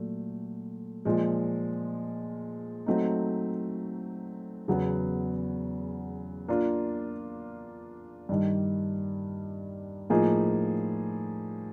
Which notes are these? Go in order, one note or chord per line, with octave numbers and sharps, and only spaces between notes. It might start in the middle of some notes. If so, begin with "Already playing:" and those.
Already playing: A#2 F#3 A3
A#2 F3 G#3
F#3 A3 C4 D#4
E2 C#3 F#3 B3
A#3 D4 F4
G2 D#3 G3
A2 F3 A#3 D#4 G#4